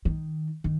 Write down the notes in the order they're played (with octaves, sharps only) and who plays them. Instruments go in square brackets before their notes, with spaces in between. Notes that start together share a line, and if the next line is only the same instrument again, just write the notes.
[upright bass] D#3
D#3